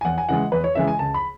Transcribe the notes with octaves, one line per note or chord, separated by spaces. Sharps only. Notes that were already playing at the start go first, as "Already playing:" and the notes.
G#5
E2 F#5
G#5
C#3 E3 G#3 F#5
E2 B4
C#5
C#3 E3 G#3 E5
G#5
C#2 A5
B5